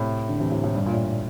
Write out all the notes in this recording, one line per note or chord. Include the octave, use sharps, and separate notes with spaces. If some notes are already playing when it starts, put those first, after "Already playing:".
Already playing: A2 C3
D3
C3 E3
A2 C3
A2
G2
A#2
A2